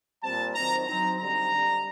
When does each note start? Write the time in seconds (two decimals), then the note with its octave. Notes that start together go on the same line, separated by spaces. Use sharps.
0.22 A#2 G3 C4 A5
0.54 D#3 F#3 C4 D#4 A#5
0.87 F#3 C4 D#4 A#5
1.20 D3 G3 C4 D#4 A#5
1.52 D3 G3 D4